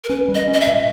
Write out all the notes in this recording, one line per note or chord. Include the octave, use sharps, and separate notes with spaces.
A#4
C#4 B4
G3
D#5
C#4
D#5
E5
A#2